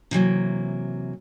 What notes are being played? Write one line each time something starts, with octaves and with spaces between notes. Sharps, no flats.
C3 E3 F#3 A#3